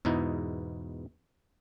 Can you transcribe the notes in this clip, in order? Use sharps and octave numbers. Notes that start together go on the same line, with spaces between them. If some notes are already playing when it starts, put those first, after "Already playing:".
E2 G#2 B2 D#4 E4